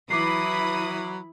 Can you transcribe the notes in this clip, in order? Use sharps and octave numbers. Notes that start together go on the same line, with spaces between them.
E3 F#3 E4 B5 D6 D#6 C7